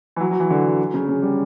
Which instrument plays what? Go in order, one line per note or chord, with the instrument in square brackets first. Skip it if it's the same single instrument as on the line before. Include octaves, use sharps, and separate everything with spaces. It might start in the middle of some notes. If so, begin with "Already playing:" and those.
[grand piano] E3
F#3
F#3
E3
D3
C#3
C#3
G3